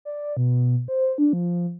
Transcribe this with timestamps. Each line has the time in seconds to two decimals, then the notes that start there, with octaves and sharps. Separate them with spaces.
0.05 D5
0.37 B2
0.88 C5
1.18 D4
1.33 F3